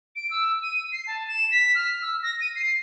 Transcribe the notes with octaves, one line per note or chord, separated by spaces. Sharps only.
D7
E6
D#7
C7
A5
E7
B6
F6
E6
A#6
D#7
C7